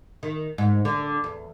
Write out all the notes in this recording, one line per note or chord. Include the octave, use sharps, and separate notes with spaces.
D#3
G#2
D3
E2